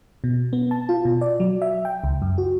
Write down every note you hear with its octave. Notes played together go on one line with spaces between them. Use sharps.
B2
B3
A5
F4
B2
D5
F#3
E5
G5
C#2
F#2
F#4